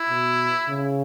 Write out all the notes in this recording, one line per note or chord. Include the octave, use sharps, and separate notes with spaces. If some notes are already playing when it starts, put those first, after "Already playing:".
Already playing: E4
B2
C#3